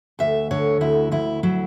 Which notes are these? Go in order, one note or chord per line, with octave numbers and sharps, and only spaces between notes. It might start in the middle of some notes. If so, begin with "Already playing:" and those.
D2 E5
D3 C#5
D2 E4
D2 E4
F#3 E4